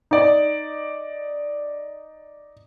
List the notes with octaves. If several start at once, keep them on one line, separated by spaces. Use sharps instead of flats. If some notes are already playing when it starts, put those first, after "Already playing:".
D#4 D5